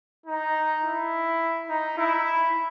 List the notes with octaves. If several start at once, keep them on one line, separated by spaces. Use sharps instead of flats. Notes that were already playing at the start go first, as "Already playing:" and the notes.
D#4
E4
D#4
E4